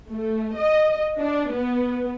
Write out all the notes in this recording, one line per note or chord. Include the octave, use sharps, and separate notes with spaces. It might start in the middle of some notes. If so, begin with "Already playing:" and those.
A3
D#5
D4
B3